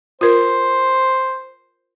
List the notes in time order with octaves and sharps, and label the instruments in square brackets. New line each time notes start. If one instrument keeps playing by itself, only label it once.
[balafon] F4 A#4 [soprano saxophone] C5